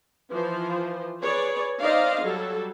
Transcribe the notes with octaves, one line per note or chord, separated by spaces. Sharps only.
E3 F3 C5
G#4 B4 C#5 D5
D#4 C5 D5 D#5 F5
F#3 G3 A4